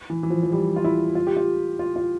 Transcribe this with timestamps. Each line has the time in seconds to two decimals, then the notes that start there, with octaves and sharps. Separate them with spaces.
0.10 E3
0.23 E3
0.30 F3
0.43 F3
0.52 G3
0.76 F4
0.84 E4
1.15 F4
1.27 G4
1.37 F4
1.79 F4
1.96 F4